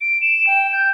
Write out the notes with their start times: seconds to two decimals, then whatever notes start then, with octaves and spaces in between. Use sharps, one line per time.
0.01 D7
0.21 E7
0.47 G5
0.72 G6